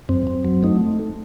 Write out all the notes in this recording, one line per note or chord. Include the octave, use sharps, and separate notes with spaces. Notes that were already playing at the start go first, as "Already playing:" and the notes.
F#2 C4
F#2
F#3
A3 D#4